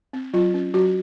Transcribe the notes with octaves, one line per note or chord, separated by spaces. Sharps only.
C4
F#3 F4
C#4
F#3 F#4